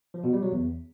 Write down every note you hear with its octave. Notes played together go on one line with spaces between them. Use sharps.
F3
B2
G3
F#3
E2